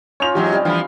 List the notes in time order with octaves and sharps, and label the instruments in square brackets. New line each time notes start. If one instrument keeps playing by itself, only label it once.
[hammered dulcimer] C#4 D#4 F4 [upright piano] C#5 F7
[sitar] E2 G#2 F#3 [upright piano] G4
[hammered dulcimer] C3 G3
[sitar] G2 E3 F3 [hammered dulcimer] F5 G#5 B5